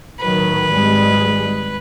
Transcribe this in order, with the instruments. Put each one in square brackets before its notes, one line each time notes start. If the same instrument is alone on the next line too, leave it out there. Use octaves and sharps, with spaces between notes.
[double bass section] A2 D#3 F#3 [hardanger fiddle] B4
[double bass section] G#1 G3 G#3